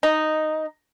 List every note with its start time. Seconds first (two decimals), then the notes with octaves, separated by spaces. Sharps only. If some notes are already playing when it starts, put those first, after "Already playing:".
0.03 D#4